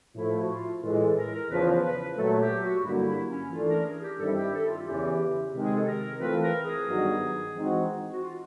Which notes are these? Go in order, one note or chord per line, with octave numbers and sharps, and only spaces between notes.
A2 F3 A3 E4
F#4
F4
A2 E3 G#3 F4
A4
A#4
A#4
E2 C#3 F3 B4
B4
A#2 F#3 A3 A4
G4
F#4
G2 D3 F#3 A#3 E4
E4
C#4
E3 A3 D4 F4
A#4
G#4
G4
G2 D#3 G3 C4 E4 A4
G4
A4
F4
E2 C#3 E3 G4
C3 D#3 G#3
G#4
A4
A#4
E3 A3 C4 F4 B4
A#4
G#4
G2 D#3 F#3 B3 D#4
E3 G#3 C4 D#4 F#4
F#4
F4